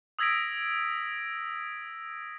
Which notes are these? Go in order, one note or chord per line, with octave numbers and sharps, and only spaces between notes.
D#6 E6 G#6 A#6 B6 D7